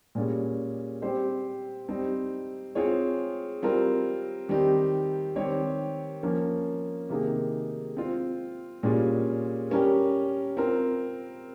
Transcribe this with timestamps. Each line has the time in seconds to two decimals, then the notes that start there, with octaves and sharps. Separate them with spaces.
0.15 A#2 G3 C#4 G#4
1.02 G3 C4 G4 C5
1.88 G3 C4 D#4
2.75 C4 F4 G#4 C#5
3.62 G3 C4 F4 A#4
4.49 D#3 G3 C4 D#4 G4
5.36 D#3 G3 C4 G4 C#5
6.23 F3 A#3 C#4
7.09 C3 D#3 A#3 D#4 G#4
7.97 C4 F4 C5
8.83 A#2 G3 C#4 F4 G#4
9.70 G3 C#4 G4 A#4
10.57 C4 F4 A#4